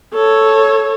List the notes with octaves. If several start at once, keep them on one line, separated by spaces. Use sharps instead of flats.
A4 C#5